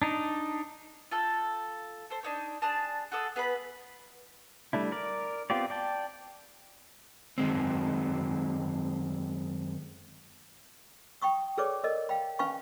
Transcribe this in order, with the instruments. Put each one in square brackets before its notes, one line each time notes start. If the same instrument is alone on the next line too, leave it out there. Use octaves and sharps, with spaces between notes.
[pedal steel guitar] D4 D#4
[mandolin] F4 A4 G6
A4 C5
D4 D#4 C#5
D4 G#4 A5
F#4 G#4 A4 D#6
B3 G#4 B4 B5
[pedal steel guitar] G3 A3 D4 E4
A#4 D5
B3 C4 F4 G4 D5
D5 G5 A5
[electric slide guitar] F#2 D#3 G#3 C4
[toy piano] G5 B5 C#6 D#6
G#4 A4 B4 C#5 D5 D6
A4 A#4 D5 D#5
F5 G5 B5
C#4 B4 F5 G#5 B5 C#6